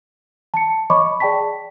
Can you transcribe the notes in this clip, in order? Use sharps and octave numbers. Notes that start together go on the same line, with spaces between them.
A5 C#7
C#5 D#5 B5 C#6 D6
G#4 D5 G5 A5 B6